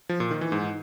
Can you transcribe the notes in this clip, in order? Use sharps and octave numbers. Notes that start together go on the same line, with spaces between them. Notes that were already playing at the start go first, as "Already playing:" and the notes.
F3
A#2
D#3
E3
G#2